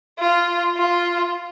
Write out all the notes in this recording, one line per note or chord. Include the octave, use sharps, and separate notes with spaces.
F4
F4